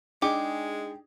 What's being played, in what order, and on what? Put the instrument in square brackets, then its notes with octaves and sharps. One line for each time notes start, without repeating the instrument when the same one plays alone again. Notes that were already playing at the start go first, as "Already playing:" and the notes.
[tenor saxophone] G#3 [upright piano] D4 D#4 G#4 [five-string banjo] G4